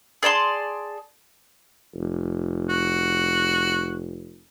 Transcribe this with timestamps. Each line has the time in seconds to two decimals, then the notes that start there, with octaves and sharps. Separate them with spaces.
0.23 G#4 D5 A5 C6
1.95 F1
2.69 F#4